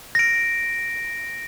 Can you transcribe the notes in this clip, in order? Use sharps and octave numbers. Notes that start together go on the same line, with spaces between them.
A#6 D7